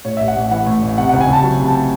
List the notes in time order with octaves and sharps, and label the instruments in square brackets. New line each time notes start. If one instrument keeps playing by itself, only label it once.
[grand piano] A2 C#5
A1 E5
F#5
A1
E3 F#5
A2
A1
C3 F#5
C#2 F#5
G#5
C#2 A5
F#3
C3
A5